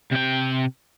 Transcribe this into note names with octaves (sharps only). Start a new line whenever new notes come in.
C3 G5